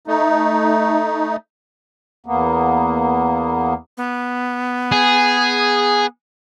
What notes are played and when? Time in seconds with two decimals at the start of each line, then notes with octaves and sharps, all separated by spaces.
0.07 A3 D#4
2.26 E2 A#3 B3
3.97 B3
4.92 G#4